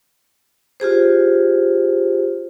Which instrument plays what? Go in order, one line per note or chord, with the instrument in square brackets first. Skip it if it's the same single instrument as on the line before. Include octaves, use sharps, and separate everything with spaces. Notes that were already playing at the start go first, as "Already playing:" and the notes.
[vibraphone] F4 G4 G#4 C5